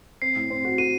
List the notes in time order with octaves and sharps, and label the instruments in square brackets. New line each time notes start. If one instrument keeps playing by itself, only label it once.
[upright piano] C4 [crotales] C7
[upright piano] A2
C4
F#4
[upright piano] F#4 [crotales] D#7